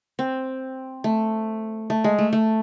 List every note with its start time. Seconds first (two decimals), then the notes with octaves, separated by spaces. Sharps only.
0.19 C4
1.04 A3
1.90 A3
2.04 G#3
2.19 A3
2.33 A3